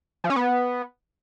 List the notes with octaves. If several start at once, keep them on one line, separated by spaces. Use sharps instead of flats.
F3
C#4
B3